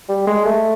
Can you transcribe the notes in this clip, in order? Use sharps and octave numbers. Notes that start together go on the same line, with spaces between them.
G3
G#3
A3